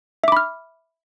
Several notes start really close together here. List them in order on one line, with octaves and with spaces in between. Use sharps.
E5 D6 B5 F6